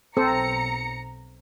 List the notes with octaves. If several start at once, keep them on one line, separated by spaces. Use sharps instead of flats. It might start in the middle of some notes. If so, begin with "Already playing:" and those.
B1 C4 A4 C5 A#5 C#7